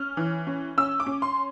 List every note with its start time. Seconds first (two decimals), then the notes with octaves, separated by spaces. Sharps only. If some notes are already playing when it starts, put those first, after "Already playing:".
Already playing: C#4 F6
0.17 E3
0.47 C#4
0.78 C#4 E6
1.00 D6
1.06 C#4
1.22 C6